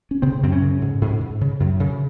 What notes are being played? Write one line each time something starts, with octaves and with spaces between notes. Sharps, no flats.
C#4
C#3 C4
F#2 C4
C#4
C#3
G#2
G#2
G#2
C#3
F#2
C#3